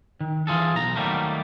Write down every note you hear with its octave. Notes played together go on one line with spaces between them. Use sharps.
D#3
E3 F4 G#4 A4
B1 A#5
D#3 F#3 G3 A3 A#3